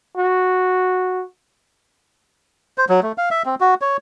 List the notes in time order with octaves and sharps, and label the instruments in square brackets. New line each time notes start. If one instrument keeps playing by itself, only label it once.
[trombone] F#4
[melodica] C5
F#3
A3
F5
E5
C4
F#4
C#5